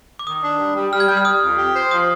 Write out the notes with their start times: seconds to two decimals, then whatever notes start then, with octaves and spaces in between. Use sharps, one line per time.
0.19 D6
0.26 D#3 D#6
0.43 D4
0.60 G3
0.76 G3
0.92 G3 F6
1.00 G#6
1.08 G3 G6
1.17 F6
1.25 G3 D#6
1.42 F2
1.58 G4
1.75 C5
1.91 F3 D#6